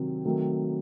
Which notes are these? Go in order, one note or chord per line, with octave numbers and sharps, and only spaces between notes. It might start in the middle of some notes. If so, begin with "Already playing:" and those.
Already playing: C3 D#3 F#3 C4
D#3 F#3 A3 C4